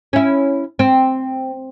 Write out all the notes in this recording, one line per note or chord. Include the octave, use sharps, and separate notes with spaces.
C#4 E4
C4